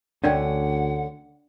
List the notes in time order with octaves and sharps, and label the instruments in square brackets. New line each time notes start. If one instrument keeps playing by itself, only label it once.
[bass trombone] D2 [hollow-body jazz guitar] D3 A3 C#4 [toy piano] D4 D5 G5 [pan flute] F#5